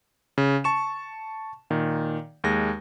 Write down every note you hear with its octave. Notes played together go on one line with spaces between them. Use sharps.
C#3
A5 C#6 E7
A#2 D#3
D#2 G#3 A#6